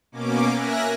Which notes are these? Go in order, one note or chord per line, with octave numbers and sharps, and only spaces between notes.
B2 A#3 C#4 D6
A#4 E5 G#5 F#6 A#6